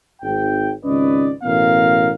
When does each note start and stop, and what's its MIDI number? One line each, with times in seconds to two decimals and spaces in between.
0.22 0.70 32
0.22 0.70 79
0.84 1.30 32
0.84 1.30 37
0.84 1.30 61
0.84 1.30 71
0.84 1.30 74
0.84 1.30 75
1.43 2.12 33
1.43 2.12 47
1.43 2.12 59
1.43 2.12 70
1.43 2.12 77